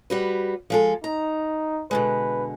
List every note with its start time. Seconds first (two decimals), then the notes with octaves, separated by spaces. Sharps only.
0.10 G3 F#4 B4
0.70 F3 G#3 A4
1.04 D#4 A#5
1.91 B2 D3 G#3 B4